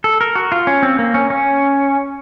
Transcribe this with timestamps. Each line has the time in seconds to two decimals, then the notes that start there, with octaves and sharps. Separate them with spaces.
0.04 A4
0.21 A#4
0.35 F#4
0.52 F4
0.67 C#4
0.83 C4
0.99 A#3
1.14 C#4
1.30 C#4